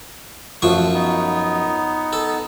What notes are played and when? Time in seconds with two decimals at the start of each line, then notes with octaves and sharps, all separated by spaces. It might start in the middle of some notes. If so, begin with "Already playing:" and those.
0.62 F#2 F3 A3 C#6
0.94 B3 D#4
2.13 A4